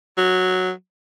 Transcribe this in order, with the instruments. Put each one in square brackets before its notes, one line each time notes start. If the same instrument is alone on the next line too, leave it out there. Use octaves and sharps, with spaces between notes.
[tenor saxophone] F#3